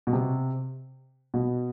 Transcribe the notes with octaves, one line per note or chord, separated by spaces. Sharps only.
B2
C3
B2